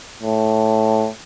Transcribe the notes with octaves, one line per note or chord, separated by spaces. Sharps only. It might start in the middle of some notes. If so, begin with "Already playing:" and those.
A2